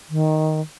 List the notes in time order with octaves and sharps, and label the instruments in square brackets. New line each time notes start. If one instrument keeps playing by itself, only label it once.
[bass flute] D#3